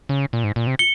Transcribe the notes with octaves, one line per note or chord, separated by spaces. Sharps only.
C#3
A#2
G#2
A#2
C3
C#7 G7